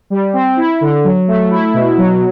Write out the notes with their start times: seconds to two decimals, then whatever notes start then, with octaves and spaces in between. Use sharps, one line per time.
0.10 G3
0.33 C4
0.57 E4
0.81 D3
1.04 F#3
1.28 A3
1.50 E4
1.74 B2
1.98 F#3